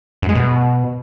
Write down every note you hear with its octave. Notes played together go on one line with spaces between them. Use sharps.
F#2
G#3
B2